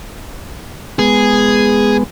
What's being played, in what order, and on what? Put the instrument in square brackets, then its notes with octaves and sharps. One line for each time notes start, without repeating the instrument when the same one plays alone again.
[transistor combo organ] G#3 B3 [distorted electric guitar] G#4